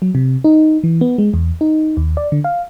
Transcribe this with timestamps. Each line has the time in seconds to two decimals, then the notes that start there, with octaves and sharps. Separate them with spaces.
0.02 F#3
0.15 C3
0.44 D#4
0.84 E3
1.01 B3
1.18 G#3
1.34 E2
1.61 D#4
1.97 D#2
2.17 D5
2.32 D3
2.44 F5